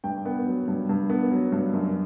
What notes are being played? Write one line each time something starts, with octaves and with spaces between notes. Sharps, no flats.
G2 G5
B3
F#3
G2
G2
B3
F#3
G2
F#2